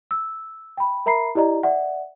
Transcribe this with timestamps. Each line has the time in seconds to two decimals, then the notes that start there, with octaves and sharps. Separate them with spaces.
0.11 E6
0.77 G5 B5
1.06 A#4 E5 A#5 B5 C7
1.35 E4 G4 D5 D#5 A#5
1.63 D5 E5 F#5